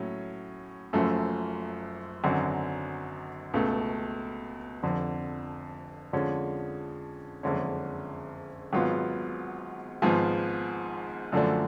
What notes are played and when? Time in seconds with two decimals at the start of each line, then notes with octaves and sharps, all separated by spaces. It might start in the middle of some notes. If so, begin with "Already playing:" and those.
Already playing: A2 F#3 C#4
0.93 F#1 F#2 F3 A3
2.24 G#1 F#2 D3 F#3
3.54 C#2 B2 A3
4.83 F1 F2 D3
6.13 F2 D3 F3 G#3 C#4
7.43 F#1 F2 D3 G#3 C#4
8.73 G#1 G#2 F#3 B3 F4
10.02 G#1 G#2 F3 B3 F4
11.32 F#2 D3 F3 A3 D4